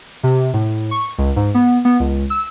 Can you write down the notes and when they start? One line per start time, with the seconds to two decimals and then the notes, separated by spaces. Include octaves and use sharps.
0.24 C3
0.54 A2
0.91 C#6
1.18 C#2
1.36 G#2
1.55 B3
1.85 B3
2.00 C#2
2.30 E6